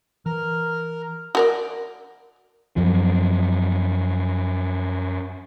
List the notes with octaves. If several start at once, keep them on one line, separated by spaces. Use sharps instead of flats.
E3 A#4 F6
F#4 A#4 D5
F#2 F3